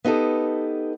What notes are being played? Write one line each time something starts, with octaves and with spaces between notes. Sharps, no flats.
B3 D#4 G4 A4